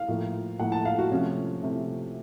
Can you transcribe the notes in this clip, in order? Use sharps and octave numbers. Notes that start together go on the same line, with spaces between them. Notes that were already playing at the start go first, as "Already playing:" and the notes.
Already playing: F5
A2 F3 A#3
A2 F3 A#3 F#5
A5
F5
F#4
C3 F3 A3 C#4
C3 F3 A3